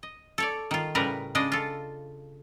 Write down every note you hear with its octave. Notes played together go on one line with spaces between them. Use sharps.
D#5
A4 C#5 D5
D#3 F4
A2 C#3 G3 A#4 B4
C#3 G#3 D4 D#5
F4 A4